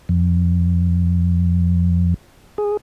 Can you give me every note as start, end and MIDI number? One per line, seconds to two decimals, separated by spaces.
0.09 2.14 41
2.58 2.77 68